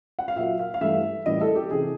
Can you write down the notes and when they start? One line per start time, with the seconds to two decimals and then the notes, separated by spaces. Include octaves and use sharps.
0.19 F#5
0.28 F5
0.36 A#2 F#3 A#3 E5
0.59 F5
0.74 F5
0.81 G2 E3 A3 E5
1.26 A2 E3 G3 A#3 D#5
1.41 A4
1.55 G4
1.71 C3 E3 G#4